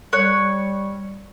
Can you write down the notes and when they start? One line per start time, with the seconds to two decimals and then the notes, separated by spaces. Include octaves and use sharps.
0.13 G3 C#5 F#6